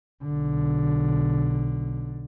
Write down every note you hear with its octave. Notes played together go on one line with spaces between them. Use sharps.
B1 D3